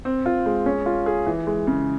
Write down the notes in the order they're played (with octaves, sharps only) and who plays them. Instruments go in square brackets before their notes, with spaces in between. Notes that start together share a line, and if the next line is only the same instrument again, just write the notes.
[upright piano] C4
F4
G#3
C#4
F4
G#4
E3
G#3
C#3